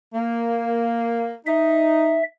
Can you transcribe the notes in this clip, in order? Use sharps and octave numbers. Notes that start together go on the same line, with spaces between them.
A#3
D#4 E5